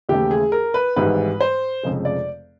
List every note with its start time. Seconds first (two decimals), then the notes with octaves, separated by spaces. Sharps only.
0.09 D#2 C#3 E3 A3 G4
0.31 G#4
0.52 A#4
0.74 B4
0.96 G#1 G#2 E3 G3 B4
1.41 C5
1.83 F1 F2 C#3 F3 G#3
2.05 D5